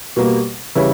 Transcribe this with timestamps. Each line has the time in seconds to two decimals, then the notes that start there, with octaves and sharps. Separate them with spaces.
0.16 B2 G3 A#3
0.75 C#3 E3 G3 C#4 E4